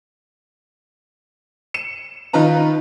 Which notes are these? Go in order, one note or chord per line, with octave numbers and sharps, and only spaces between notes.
C#7 E7
D#3 D#4 F4 B4 A#5